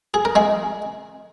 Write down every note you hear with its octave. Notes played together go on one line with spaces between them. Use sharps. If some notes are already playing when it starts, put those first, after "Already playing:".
G#4
A#4
G#3 G#4